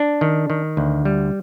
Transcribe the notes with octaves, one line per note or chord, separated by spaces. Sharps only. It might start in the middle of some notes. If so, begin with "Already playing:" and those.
Already playing: D4
D#3
D#3
D2
G3